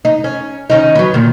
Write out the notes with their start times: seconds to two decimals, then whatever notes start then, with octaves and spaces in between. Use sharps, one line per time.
0.05 D#4
0.24 C#4
0.70 D#3 C#4 D#4
0.95 F#3 B4
1.14 A#2 D#3